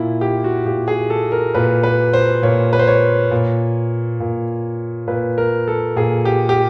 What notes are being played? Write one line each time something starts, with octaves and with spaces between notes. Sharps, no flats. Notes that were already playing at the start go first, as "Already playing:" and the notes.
Already playing: A#2 E4
G4
F#4
A#2 G4
G#4
A4
A#4
A#2 B4
B4
C5
A#2 C#5
B4
C5
C#5
A#2
A#2
A#2 B4
A#4
A4
A#2 G#4
G4
G4